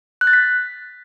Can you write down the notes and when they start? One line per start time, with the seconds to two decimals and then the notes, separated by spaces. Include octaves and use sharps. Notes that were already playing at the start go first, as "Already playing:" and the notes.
0.21 F#6
0.27 A6
0.33 B6